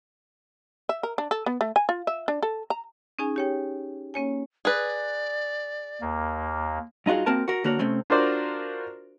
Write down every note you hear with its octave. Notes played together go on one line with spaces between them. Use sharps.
E5
A#4
D4
A4
B3
A3
G#5
F4
E5
D4
A4
A#5
C#4 D#4 G#4 G#5
G4 C#5 G5
A#3 C#4 C#5 G#5
G#4 B4 D5
D#2 A#3
G2 D#4 F4 F#4 G#4
A#3 C4 F#4 A#4 A5
F#4 A#4
D3 A#3 B3 F#4 A#4 C#5
C3 A3 C4 C#4
D4 F4 F#4 A#4 C5 D5